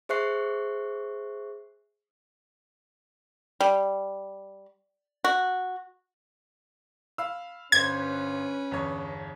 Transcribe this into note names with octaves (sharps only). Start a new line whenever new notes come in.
G#4 C5 E5 C#6 F#6 C7
G3
F#4
F5 B5 E6
G1 C#4 B4 C5 G#6
G1 E2 C#5